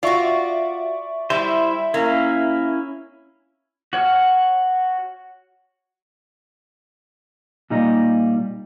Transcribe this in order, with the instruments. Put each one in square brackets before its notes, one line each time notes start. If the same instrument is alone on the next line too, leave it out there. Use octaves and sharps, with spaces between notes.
[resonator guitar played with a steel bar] F4 F#4 [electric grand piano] D5 E5 C#6
[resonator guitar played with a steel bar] G3 [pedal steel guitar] E4 C5 [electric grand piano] E5
[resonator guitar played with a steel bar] A#3 [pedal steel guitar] C#4 E4
[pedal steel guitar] F#4 C#5 F#5 F6
[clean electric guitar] A#2 G3 D#4 D#5